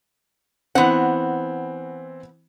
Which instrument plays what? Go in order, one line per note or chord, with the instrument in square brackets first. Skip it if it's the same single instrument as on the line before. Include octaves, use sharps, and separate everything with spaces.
[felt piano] E3 C4 [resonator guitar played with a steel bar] B3 F#5